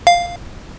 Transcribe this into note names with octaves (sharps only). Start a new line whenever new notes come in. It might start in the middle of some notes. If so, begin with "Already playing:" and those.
F5